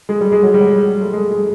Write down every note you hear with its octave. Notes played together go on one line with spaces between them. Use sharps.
G#3
G3
G#3
F#3
G3
F#3
A3
G#3
G#3